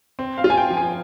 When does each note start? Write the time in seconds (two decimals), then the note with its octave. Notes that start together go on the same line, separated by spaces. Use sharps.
0.19 C4
0.38 F5
0.44 F4
0.50 G#5
0.57 G5
0.70 F3
0.77 G#5